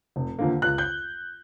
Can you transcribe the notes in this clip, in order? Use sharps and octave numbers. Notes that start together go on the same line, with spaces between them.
F1
D#2 D3 F3 A#3
C#2 F#6
G6